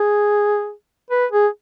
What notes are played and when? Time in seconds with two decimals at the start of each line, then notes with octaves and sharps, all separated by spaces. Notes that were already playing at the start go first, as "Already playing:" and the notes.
Already playing: G#4
1.11 B4
1.32 G#4